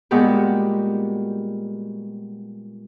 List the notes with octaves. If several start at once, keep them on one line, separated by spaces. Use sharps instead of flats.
A#2 G3 G#3 B3 F#4 G4